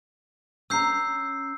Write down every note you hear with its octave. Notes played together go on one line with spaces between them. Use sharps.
C#4 A#5 E6 G6 C7